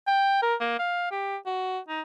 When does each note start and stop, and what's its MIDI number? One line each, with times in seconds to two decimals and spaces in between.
0.08 0.39 79
0.42 0.55 70
0.61 0.79 58
0.79 1.08 77
1.11 1.37 67
1.46 1.79 66
1.89 2.01 63